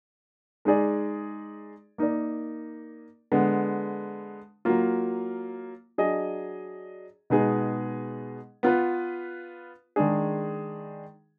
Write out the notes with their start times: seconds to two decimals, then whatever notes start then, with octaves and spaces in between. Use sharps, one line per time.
0.65 G#3 D#4 G#4 D5
1.98 A#3 D#4 A#4 D5
3.32 D3 G#3 B3
4.65 F#3 A#3 F4
5.98 F#3 D4 G#4 D#5
7.30 B2 G#3 B3 D#4 G#4
8.63 B3 F4 B4
9.96 D#3 G#3 D4 G#4